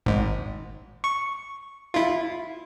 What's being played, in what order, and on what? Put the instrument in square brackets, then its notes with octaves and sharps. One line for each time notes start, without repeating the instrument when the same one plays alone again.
[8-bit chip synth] G#1 G#2
C#6
E4 F4